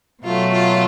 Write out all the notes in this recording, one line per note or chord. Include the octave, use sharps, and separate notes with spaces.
B2 F#3 A3 F4
F4